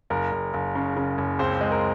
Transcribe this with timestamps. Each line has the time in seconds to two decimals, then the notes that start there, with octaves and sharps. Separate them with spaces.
0.10 F#1 A#4
0.31 F#1
0.54 F#1
0.75 C#3
0.96 C#3
1.18 F#1
1.39 C#2 C4 C5
1.61 G#3
1.72 A#4